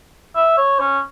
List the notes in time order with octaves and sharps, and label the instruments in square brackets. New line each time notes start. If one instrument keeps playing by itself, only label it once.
[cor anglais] E5
C#5
C#4